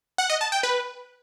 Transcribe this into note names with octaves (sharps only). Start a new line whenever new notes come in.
F#5
D#5
A5
G5
B4